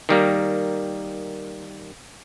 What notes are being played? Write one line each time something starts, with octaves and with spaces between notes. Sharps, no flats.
D#3 G3 A#3